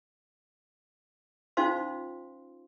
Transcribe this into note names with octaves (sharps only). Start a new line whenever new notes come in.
C#4 D#4 F4 C5 F5 C6